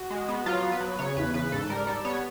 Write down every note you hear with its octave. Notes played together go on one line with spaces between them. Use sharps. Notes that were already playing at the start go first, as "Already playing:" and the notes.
Already playing: F#4
G#3
B3
F#3 F4
B3
B4
F#3
C#3 C#5
E2 B4
C#3 B4
G#2 A4
G3 A#4
G3 A4
B3 C#5